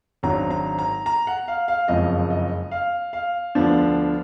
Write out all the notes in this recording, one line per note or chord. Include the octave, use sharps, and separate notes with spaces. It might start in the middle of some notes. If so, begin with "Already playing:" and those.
G#1 G#2 F#3 D4 A#5
A#5
A#5
A#5
F#5
F5
F5
F#1 F2 F3 G#3 D#5
D#5
F5
F5
D2 D3 F3 B3 D4